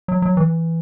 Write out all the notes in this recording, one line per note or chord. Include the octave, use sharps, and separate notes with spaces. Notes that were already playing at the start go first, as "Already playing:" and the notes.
F#3
F#3
E3